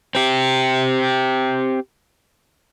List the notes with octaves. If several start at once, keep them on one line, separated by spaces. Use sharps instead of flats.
C4 G4